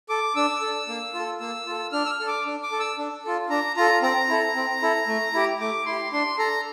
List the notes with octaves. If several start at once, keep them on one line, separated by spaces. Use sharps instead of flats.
A4 D6
D4 E6
A4
A#3
F4
A4
A#3 E6
F4 A4
D4 F6
E6
F6
A4
D6
D4
D6
A4
E6
D4
F4 A4
D4 A#5
F4 A4 A#5
C4 A#5
E4 A4
C4
E4 A4
A3
E4 G4
A3 D6
E4 G4 C6
D4 C6
A4 A#5